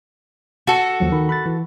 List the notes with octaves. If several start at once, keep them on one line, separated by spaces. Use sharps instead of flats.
F#4 A4
D#2 F3 F#3
D#3 B5
B5 F#6 A6
E3